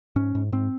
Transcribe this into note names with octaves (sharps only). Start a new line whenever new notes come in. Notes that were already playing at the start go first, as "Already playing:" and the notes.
G#2 C#4
G#2
G#2 C4